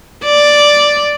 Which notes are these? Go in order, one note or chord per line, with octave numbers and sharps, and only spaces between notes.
D5